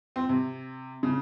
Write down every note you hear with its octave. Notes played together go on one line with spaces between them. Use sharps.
C4
C3
C#3